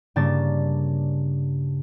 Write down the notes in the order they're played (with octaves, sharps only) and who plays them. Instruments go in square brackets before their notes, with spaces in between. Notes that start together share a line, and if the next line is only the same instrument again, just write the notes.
[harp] G2 C#3 A#3 D4 A6